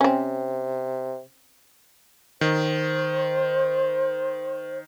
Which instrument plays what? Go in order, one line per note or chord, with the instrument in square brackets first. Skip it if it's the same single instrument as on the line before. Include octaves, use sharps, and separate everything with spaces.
[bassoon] C3 [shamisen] C4 C#4
[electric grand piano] D#3 [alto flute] C5